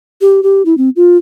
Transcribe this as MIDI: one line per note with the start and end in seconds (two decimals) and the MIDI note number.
0.21 0.43 67
0.43 0.62 67
0.66 0.77 64
0.78 0.90 60
0.96 1.17 65